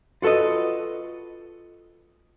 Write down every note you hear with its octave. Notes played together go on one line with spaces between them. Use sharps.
F4 F#4 A4 B4 D#5